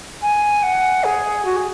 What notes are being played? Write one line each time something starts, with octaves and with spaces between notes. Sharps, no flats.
G#5
F#5
G#4
F#4
G#4